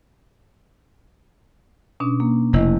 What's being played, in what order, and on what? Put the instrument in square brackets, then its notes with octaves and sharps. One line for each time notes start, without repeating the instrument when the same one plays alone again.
[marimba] B2 C#4 D4
A#3
[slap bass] F1 [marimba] A3 E4 D#5